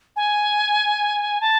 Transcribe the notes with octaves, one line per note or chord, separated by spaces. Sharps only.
G#5
A5